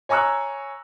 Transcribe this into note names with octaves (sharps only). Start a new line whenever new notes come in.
C#5 G#5 A#5 C#6 E6 F#6